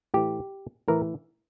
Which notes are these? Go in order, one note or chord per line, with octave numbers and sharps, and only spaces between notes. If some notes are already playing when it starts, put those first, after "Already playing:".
A2 E3 G4
A2 E3 A#4